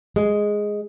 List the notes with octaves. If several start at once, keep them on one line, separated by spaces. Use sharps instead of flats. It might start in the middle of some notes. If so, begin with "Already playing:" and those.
G#3